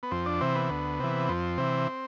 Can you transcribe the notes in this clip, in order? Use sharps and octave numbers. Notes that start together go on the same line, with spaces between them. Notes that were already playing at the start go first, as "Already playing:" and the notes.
B3
F2 C4
D4
C3 E3 C4
B3
D2
C3 E3
F2 C4
C3 E3